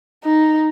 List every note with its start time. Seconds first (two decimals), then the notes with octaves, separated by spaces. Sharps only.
0.24 D#4